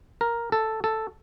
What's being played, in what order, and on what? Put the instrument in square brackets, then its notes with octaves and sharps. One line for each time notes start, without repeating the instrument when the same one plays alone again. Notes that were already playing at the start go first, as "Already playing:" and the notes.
[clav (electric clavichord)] A#4
A4
A4